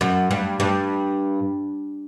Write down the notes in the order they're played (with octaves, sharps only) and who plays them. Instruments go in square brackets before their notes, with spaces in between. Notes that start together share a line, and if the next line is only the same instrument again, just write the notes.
[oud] F#2
G2
G2